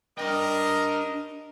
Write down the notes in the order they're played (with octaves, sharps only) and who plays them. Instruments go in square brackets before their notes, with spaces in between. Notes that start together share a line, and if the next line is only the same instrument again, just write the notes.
[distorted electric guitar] D4 G5 [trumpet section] A#4 D#5